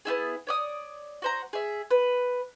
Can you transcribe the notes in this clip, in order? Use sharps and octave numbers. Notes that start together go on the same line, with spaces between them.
B3 D4 E4 G#4
C#5 D5 D#6
F#4 C5 A#5
G#4 E5
B4